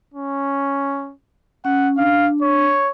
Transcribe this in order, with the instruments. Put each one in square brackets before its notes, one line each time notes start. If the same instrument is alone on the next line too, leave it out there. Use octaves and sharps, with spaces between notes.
[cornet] C#4
[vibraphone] C#4 [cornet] F#5
[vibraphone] D4 [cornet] F5
[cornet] C#5